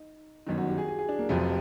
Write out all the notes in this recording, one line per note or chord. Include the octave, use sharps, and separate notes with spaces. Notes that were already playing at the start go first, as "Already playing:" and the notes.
Already playing: D#4
G1 F#2 D#3 D#4
F#4
G4
G#4
G#4
G#4
D4
A#3
F1 F2 C3 F3 F#3